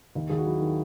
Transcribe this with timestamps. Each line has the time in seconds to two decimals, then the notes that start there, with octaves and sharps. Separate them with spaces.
0.15 D#2 D#4
0.29 D#2 G#4
0.38 F#4
0.45 F#3 E4
0.61 D#3